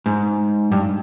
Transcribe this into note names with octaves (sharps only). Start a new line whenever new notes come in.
G#2
G2